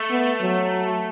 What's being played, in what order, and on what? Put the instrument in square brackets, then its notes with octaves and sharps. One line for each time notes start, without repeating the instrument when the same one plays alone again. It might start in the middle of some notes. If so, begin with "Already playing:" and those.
Already playing: [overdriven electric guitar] A3
[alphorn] B3
F#3